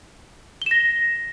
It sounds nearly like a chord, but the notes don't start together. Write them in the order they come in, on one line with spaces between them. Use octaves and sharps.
G7 E7 A#6